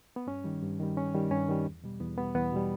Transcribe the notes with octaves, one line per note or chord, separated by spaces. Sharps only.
B3
G2 C#4
D#3 G3
G2
D#3 G3
G2 C#4
D#3 G3
G2 C#4
D#3 G3
E2
B2 G3
E2 B3
B2 G3 B3
E2 B3
B2 G3